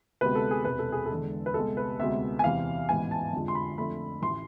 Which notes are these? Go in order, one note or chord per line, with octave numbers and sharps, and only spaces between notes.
D2 C3 G#3 B3 B4
A4
G#4
E1 E2 C3 B4
A4
G#4
A4
E2 D3 G#3
B4
C2 C3 G#3 B3 A4
B4
D2 C3 G#3 B3 E5
G#5
E2 C3 E3 F5
A1 G#2 E3 B3 G#5
A5
F2 D3 F3 G#3
C6
B5
F2 D3 A3 B5
A1 E3 C6